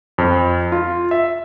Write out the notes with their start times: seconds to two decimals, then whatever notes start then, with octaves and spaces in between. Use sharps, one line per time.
0.18 F2
0.72 F4
1.11 E5